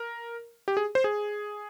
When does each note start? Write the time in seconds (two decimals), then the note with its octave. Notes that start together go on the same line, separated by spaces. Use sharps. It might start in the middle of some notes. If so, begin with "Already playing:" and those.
Already playing: A#4
0.68 G4
0.77 G#4
0.95 C5
1.04 G#4